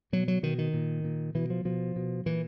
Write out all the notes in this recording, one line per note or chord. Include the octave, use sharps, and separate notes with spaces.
B2 F#3
F#3
B2 D#3
D#3
A#2
A#2
B2 E3
F3
B2 F3
B2
A#2 E3